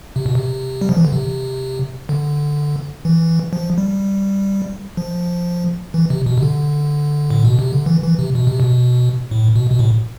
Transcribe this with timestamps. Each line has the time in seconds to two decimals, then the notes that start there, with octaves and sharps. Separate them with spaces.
0.16 C3
0.26 B2
0.35 C3
0.81 G3
0.89 F3
0.97 E3
1.05 D3
1.12 C3
2.09 D3
3.05 E3
3.53 F3
3.78 G3
4.97 F3
5.94 E3
6.10 C3
6.26 B2
6.38 C3
6.43 D3
7.30 A2
7.45 B2
7.59 C3
7.73 D3
7.86 E3
8.03 E3
8.19 C3
8.35 B2
8.47 C3
8.60 B2
9.31 A2
9.56 B2
9.71 B2
9.79 A2